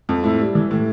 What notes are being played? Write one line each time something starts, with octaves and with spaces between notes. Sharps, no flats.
F2
A2 E4
G3
E3
A2